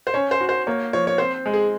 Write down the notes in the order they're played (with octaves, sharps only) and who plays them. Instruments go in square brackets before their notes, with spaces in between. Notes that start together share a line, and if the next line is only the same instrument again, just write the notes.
[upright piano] C5
[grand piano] C#4 [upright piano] C#5
[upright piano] C5
[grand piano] F#4
[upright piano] C5
[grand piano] A#3 [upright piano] C#5
[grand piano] F3 [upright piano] C#5
[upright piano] C#5
[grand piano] C4 [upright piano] C5
[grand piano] G#3
[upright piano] G#4